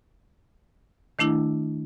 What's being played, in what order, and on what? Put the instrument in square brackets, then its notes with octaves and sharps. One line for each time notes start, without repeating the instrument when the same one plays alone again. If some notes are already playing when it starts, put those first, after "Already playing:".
[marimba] D#3 A3 D4 E4